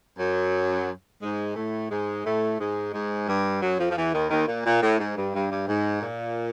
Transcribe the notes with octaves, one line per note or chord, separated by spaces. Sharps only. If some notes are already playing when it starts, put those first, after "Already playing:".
F#2 F#3
G#2 G#3
A2 A3
G#2 G#3
A2 A3
G#2 G#3
G#2 G#3
G2 G3
F#2 F#3
F2 F3
F3
E2 E3
D#2 D#3
D#2 D#3
A#2
A#2
A2
G#2
G2
G2
G2
G#2
A#2